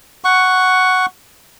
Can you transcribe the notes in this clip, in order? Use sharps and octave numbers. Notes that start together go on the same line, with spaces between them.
F#5 C#6